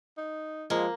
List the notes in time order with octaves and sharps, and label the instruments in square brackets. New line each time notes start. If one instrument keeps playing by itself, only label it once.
[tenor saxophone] D#4
[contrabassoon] F3 [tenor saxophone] G#3 [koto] A#3